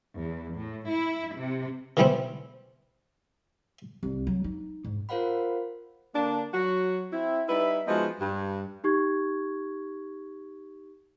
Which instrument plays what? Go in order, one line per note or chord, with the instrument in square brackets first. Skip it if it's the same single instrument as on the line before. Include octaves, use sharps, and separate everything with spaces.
[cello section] E2
A2
E4
C3
[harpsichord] B2 D3 E3 G3 B3 C4
[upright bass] C2
F#3
D#4
G#2
[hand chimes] F4 A#4 C5 F5 F#5 B5
[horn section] D3 A#3 D4
F#3 F#4
C4 E4
G3 D#4 E4 B4 E5
F3 G#3 B3 D#4 F#4
G2
[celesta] D#4 G4 C#6 G#6